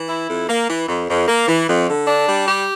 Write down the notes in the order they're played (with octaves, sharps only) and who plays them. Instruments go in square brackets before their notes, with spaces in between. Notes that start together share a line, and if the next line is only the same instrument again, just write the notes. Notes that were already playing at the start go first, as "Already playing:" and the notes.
Already playing: [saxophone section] E3
E4
F2
A#3
E3
F2
F2
A#3
E3
F2
D3
D4
G3
G4